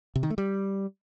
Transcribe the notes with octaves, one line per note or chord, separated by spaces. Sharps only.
C3
D#3
A3
G3